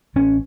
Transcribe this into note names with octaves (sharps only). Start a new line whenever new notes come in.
A1 C#4